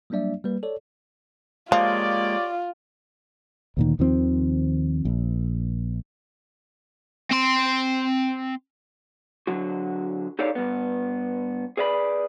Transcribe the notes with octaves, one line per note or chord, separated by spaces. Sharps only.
F#3 G3 A#3 D4 D5 E5
G3 A#3 B4
A4 C#5 D5
F3 G#3 A#3 F4 G4 C#5 D5
D2 A#2 D#3
D#2 D#3 F3 C4
A#1
C4 C6
D3 F#3 F#4
D#4 G4 A4 C#5 D5 F5
G2 B3
G#4 B4 D5 F#5 B5